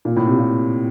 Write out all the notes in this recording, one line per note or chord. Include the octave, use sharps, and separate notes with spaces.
A#2
A2
C3
A#2